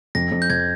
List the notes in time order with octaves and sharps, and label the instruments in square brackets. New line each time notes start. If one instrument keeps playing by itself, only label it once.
[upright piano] F2 [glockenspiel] A#6
[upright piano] F2
[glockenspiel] G6
[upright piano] F2 [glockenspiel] G#6